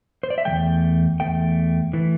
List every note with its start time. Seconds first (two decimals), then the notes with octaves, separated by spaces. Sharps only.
0.23 C5
0.30 D5
0.38 E5
0.45 E3 A3 G5
0.50 E2
1.20 E2 E3 A3 G5
1.93 E3 A3